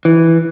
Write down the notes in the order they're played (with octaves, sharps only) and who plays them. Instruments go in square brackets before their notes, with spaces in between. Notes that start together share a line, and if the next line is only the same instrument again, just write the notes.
[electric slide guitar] E3